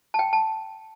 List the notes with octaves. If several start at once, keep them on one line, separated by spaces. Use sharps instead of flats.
A5
G5
A5